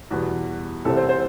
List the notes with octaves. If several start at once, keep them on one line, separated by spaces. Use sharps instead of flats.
E2 B2 G3 B3 F#4
C2 C3 E3 G3 C4 A4
C5
C5